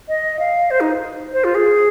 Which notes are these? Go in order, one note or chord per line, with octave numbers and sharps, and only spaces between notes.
D#5
F5
C5
D#4
C5
F4
G#4